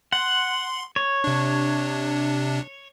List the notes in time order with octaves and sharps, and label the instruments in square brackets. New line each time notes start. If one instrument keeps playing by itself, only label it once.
[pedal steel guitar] F#5 [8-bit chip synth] C6
[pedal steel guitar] C#5
[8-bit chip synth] C3 D4